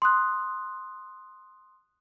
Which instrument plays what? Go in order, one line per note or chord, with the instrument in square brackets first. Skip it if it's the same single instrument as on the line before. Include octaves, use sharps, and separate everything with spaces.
[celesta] C6 D#6 F#6